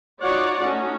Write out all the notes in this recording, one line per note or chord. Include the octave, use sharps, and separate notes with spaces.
D#4 F4 F#4 C#5 D5 F#5
A3 C#4 D#4 F#4